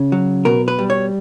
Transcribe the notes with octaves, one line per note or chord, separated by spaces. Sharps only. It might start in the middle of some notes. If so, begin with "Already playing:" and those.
Already playing: C#3
F#3
B2 A#4
B4
G3
C#5